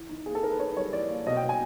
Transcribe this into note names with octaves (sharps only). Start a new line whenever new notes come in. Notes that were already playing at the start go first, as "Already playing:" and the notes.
Already playing: E3
D#4
A#3 G#4
A4
D#4 A#4
B4
D#4 C#5
G3 C#5
E3 D5
A#3
B2 D#5
G5
B2
G#5